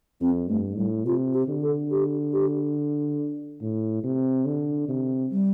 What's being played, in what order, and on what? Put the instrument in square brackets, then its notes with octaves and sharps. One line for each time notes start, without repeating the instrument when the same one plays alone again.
[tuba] F2 [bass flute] C4
[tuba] G2 [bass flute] A3
[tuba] A2 [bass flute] G3
[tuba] C3 [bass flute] F4
[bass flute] G4
[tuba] D3
[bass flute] A4
G4
G4
[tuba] A2
C3
D3
C3
[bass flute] G3